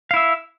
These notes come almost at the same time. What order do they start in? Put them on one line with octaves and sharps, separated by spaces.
F5 E4 E5